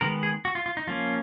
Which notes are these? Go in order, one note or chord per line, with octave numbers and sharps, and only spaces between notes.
D#3 G#3 B3 A#4
G#4
F#4
F4
F4
D#4
F3 A#3 C#4 F4